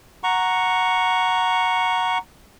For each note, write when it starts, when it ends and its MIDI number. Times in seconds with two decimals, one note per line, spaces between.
0.24 2.18 78
0.24 2.18 82
0.24 2.18 85